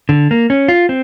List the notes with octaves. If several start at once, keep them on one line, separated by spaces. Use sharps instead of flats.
D3
A#3
C#4
F4
C4